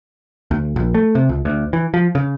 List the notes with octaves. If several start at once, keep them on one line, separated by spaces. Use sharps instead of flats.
D2
A#1
A3
C3
C#2
D2
E3
F3
C#3